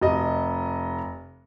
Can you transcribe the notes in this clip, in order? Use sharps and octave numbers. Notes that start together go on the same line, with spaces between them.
F1 D#5